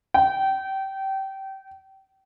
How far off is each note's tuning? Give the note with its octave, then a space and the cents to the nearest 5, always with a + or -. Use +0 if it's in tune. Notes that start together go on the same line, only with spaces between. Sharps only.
G5 -25